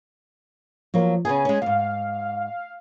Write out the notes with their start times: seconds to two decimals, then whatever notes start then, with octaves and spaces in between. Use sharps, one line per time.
0.94 F3 F#3 A#3
1.25 C#3 B3 G#4 G#5
1.45 G#3 C#4
1.62 D#2 G#2 F5